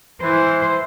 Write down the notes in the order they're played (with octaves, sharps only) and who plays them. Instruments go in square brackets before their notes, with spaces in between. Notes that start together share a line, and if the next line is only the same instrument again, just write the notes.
[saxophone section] E3 [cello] C5